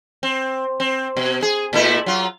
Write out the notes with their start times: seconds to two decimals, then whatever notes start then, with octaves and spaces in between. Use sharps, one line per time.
0.23 C4
0.80 C4
1.17 B2
1.42 G#4
1.73 A#2 A3 E4
2.06 F#3 F4